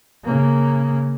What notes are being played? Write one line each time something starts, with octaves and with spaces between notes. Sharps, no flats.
C#3 A#3